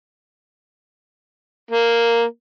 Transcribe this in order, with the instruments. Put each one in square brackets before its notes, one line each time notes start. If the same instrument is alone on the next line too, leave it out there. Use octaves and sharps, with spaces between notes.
[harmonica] A#3